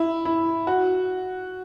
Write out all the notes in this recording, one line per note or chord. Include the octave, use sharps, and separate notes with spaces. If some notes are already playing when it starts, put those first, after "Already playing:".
Already playing: E4
E4
F#4